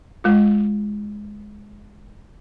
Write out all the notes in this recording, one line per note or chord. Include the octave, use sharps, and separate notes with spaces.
G#3 F4